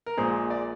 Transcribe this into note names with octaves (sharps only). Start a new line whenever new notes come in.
A#4
A#1 A#2 G#3 G#4 C5
D5